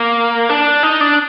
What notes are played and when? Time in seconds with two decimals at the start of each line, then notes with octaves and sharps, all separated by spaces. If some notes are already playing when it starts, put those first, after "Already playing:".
Already playing: A#3
0.49 D4
0.83 D#4
1.01 D4